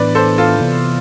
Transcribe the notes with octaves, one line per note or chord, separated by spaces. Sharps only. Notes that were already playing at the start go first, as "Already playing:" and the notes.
Already playing: A2 E3 B3 D4 B4 D5
A4 C5
F4 A4
C3 E3 B3